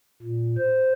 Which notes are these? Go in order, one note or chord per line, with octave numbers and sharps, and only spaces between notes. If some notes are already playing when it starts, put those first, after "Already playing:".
A#2
C5